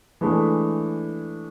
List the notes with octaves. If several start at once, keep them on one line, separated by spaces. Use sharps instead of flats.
E3 G#3 A3 D4